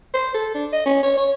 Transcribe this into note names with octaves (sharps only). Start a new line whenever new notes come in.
C5
A4
D4
D#5
C#4
C#5
C#5